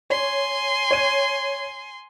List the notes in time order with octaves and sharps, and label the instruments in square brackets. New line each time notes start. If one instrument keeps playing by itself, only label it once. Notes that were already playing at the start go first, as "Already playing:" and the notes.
[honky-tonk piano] C#5 [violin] G#5 C6
[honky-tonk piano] C#5 D#7